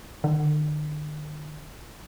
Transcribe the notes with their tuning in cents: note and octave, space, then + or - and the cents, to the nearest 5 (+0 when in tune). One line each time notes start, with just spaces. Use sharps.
D3 +45